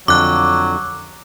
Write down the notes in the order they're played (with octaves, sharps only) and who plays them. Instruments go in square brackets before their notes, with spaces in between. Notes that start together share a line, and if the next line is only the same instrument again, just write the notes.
[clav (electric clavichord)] F2 D3 [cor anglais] F#3 [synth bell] D6 F#6